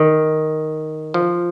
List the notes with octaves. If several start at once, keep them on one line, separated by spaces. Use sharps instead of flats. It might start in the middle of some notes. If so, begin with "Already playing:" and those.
Already playing: D#3
F3